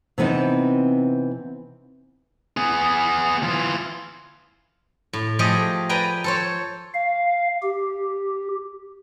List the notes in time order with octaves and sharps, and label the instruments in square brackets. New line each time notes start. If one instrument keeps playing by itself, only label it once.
[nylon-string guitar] C3 E3 B3 C4 D#4
[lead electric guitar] B3 G#4
E3 F4
[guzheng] A2
F3 A3 G4 G#4 D#5
B4 D5 G5 G#5 A#5
A4 C5 C#5
[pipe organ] F5
G4